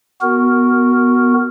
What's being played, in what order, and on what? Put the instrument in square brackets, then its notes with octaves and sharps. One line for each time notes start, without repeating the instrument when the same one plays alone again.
[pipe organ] B3 F#4 A#4